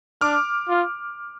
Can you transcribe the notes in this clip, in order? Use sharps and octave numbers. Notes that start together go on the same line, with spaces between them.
D4 D6 F6
F4